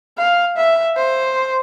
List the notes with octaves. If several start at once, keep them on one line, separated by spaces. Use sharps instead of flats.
F5
E5
C5